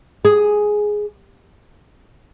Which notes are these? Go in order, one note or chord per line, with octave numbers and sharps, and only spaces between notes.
G#4